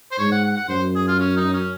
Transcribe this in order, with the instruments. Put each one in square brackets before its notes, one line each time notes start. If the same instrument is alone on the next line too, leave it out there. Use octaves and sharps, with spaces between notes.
[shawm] C5
[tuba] G#2 [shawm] C#5
[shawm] F#5
F#5
F#5
[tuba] F#2 [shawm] C5
[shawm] G#4
F4
C#4
D#4
C#4